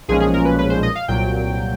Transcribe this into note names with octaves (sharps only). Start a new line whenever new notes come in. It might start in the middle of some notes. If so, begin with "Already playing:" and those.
B1 A#2 F3 G#3 C#4 G#4
G#4
A#4
B4
B4
C5
D#5
F5
C2 A#2 F#3 G5